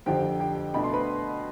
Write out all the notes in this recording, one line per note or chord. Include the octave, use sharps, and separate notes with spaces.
F2 D3 F3 C4 G4 G5
G4 G5
B2 A3 D4 B5
C6
B4 B5